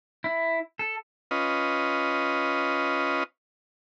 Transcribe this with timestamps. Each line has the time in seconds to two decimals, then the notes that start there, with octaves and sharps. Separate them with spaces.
0.24 E4
0.79 A4
1.31 C#4 F4 B4 D#5